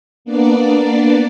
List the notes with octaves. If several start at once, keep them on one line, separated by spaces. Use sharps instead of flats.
A#3 B3 D4 D5